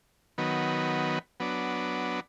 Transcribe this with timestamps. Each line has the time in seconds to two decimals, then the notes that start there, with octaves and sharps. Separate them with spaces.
0.38 D#3 F#3 B3
1.40 F#3 B3 D4